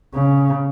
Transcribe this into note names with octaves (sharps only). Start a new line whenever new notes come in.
C#3